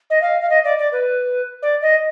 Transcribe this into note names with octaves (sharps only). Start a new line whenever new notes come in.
D#5
F5
F5
D#5
D5
D5
B4
D5
D#5